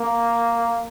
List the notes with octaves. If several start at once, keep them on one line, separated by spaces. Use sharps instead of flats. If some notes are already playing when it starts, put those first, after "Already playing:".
Already playing: A#3